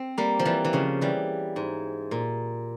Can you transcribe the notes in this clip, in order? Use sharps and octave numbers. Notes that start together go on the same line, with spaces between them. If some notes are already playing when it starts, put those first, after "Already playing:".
Already playing: C4
G3 A#3
F3
E3 G3
E3
C#3 F3
E3 G3
G#2
A#2